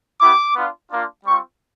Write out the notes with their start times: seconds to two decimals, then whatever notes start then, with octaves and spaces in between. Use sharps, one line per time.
0.20 B3 E4 G4 D6
0.55 B3 D4 F4
0.91 A#3 D4 F4
1.25 G3 C4 F4 C#6